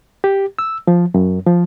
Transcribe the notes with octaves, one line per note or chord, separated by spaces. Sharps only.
G4
E6
F3
F#2
F3